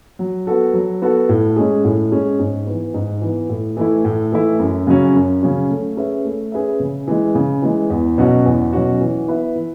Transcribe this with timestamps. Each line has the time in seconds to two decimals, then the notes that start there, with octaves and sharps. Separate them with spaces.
0.19 F#3
0.47 B3 F#4 A4
0.74 F#3
1.02 B3 F#4 A4
1.29 A2
1.56 G#3 C#4 G#4
1.85 A2
2.12 G#3 C#4 G#4
2.39 G#2
2.67 E3 B3
2.94 G#2
3.22 E3 B3
3.49 A2
3.77 E3 A3 E4
4.05 A2
4.32 E3 A3 E4
4.59 F#2
4.87 C#3 F#3 C#4
5.15 F#2
5.43 C#3 F#3 C#4
5.70 A3
5.97 C#4 G#4 B4 E5
6.25 A3
6.52 C#4 G#4 B4 E5
6.80 C#3
7.08 E3 G#3
7.35 C#3
7.62 E3 G#3
7.90 E2
8.18 B2 F#3 C#4 F#4
8.46 E2
8.73 B2 F#3 C#4 F#4
9.01 E3
9.28 B3 E4 B4 E5
9.55 E3